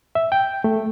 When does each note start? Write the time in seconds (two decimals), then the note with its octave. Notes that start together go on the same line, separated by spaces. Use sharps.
0.15 E5
0.32 G5
0.64 A3